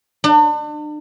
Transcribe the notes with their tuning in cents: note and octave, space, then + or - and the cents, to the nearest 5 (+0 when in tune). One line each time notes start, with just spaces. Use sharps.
D4 +40